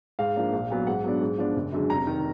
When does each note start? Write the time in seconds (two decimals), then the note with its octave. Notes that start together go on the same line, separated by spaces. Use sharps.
0.19 G#2 F5
0.36 F3 A#3 D4
0.53 A#1
0.70 A#2 F#3 B3
0.87 G#2 F#5
1.04 F#3 B3 D4
1.21 G#2
1.38 F3 B3 D4
1.56 F#1
1.72 F#2 D3 G#3
1.90 F1 A#5
2.07 D#3